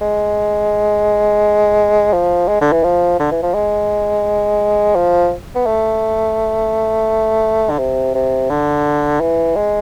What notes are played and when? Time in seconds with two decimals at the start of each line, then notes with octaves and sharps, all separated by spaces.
0.01 G#3
2.13 F3
2.48 G#3
2.61 D3
2.72 E3
2.83 F3
3.20 D3
3.31 E3
3.42 F3
3.54 G#3
4.95 F3
5.55 B3
5.66 A3
7.70 D3
7.78 C3
8.14 C3
8.50 D3
9.20 E3
9.56 G#3